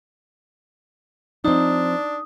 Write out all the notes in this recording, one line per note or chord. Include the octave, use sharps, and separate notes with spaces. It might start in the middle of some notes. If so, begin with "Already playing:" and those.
F3 C4 D4 D#4 D#6